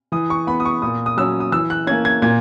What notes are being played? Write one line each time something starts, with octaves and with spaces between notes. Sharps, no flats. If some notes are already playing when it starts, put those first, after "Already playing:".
E3 D#6
C#6
B3 B5
D#6
C#6
A#2 D#6
D#6
F#3 C#4 E6
D#6
E3 E6
F#6
A#3 C#4 G#6
G#6
A#2 G#6